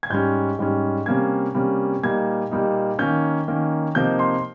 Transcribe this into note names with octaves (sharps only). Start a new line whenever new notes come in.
G#6
G#2 G3 C#4 G6
G#2 G3 C#4
C3 G3 A#3 C#4 G#6
C3 G3 A#3 C#4
A#2 G3 A#3 D#4 G#6
A#2 G3 A#3 D#4
D#3 A#3 C#4 G6
D#3 A#3 C#4
C3 F3 A#3 D#4 G6
C6